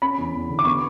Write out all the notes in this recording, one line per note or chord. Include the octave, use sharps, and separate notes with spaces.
C#4 B5
E2
E2
D3
D6
B3 C#6